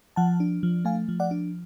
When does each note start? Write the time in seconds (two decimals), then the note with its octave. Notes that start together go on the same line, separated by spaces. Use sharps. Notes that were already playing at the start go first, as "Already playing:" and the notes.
0.16 F3 F#5 A5
0.40 D4
0.63 F3
0.85 A3 F5 G#5
1.09 F3
1.20 D5 F#5
1.31 D4